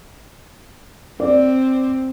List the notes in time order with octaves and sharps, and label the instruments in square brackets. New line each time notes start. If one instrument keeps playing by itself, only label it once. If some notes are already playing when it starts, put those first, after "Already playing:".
[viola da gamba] C4 [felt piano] D5